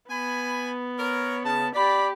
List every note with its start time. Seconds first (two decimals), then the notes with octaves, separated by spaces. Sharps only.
0.10 B3 G#5 B5
0.99 A#4 C#5
1.44 C#3 A5
1.75 G4 D5 B5